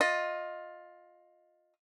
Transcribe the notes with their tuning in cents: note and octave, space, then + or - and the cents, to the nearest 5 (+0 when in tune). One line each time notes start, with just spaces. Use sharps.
F4 +15 D#5 +0